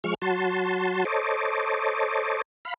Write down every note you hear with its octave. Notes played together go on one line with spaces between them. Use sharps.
F3 G#3 C#6 F6
F#3 F#4 A5 C6
A4 C5 C#5 D#5 D6
F5 B5